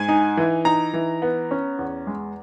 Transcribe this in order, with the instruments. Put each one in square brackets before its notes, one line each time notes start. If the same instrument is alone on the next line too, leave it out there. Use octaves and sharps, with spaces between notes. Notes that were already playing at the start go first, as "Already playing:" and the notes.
Already playing: [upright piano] G#2 G#5
D#4
E3
D#4 A#5
E3
B3
C#4
E2
G#3